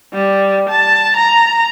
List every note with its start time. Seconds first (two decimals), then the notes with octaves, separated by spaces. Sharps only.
0.13 G3
0.69 A5
1.16 A#5